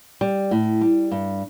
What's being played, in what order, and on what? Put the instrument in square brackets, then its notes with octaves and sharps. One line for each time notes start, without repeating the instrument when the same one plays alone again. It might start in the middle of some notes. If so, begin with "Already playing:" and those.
[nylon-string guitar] G3
A2
G3
G2